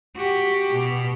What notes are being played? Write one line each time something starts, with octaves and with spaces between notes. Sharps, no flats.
F#4 G4
B2